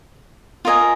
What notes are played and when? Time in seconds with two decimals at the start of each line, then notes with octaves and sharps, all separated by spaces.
0.65 F4 A#4 D#5 G#5